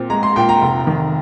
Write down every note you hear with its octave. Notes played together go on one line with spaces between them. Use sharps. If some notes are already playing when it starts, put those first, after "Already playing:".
Already playing: A#2 C4
G#3 A#5
C6
A#2 G5
A#5
F1
D#3